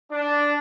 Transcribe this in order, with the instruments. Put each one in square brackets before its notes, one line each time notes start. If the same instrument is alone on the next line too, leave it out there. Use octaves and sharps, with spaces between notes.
[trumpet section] D4